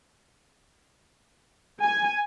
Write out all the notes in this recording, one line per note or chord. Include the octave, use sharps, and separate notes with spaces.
G#5